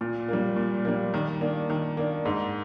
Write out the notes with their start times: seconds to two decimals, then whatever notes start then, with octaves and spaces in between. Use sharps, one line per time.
0.01 A#2
0.28 G3 A#3
0.56 A#2
0.85 G3 A#3
1.14 D#3
1.41 A#3 D4
1.70 D#3
1.97 A#3 D4
2.25 G#2